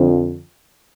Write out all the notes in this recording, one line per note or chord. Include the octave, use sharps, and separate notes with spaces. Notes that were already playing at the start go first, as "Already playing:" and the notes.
Already playing: F2 D3 F3